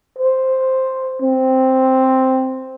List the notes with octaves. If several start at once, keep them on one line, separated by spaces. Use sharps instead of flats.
C5
C4